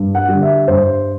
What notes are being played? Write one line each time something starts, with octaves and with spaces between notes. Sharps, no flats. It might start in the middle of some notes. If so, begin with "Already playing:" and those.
Already playing: G2
F#5
D3 G3
E5
G2 C5